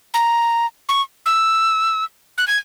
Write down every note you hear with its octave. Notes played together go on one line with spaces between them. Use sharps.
A#5
C#6
E6
F#6
G#6